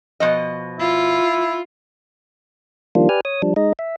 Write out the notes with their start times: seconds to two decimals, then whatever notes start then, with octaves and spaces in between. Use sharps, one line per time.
0.20 B2 F3 D#5
0.79 E4 F4
2.95 D#3 F3 G3 A#3 D4 F4
3.09 G4 B4 D5 G#5 F6
3.25 C#5 D#6
3.42 F3 G3 D4
3.56 G#3 D#4 D#5
3.79 E5